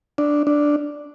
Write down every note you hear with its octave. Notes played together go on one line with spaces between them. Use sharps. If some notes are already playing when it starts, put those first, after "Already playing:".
D4
D4